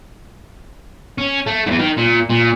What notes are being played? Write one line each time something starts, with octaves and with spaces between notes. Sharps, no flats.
C#4
A3
E2 G#2
D#3
A#2
A#2